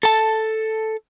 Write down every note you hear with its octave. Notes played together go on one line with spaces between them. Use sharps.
A4 A5